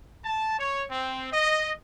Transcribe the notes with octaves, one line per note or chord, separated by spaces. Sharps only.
A5
C#5
C4
D#5